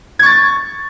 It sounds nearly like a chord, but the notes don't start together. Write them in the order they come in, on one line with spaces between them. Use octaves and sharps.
G#6 C#6 A6